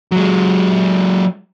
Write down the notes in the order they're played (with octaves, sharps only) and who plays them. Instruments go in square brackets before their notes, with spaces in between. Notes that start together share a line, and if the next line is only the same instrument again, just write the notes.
[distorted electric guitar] F#3 G#3